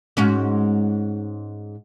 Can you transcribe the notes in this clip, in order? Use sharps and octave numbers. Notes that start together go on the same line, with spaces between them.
G#2 C#4 F#4